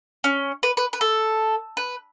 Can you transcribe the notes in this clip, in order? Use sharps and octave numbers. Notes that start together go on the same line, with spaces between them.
C#4
B4
B4
B4
A4
B4